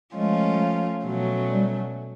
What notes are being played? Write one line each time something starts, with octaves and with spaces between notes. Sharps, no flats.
F3 G#3 A3 C#4 F4
B2 F#3 A3 C#4
G3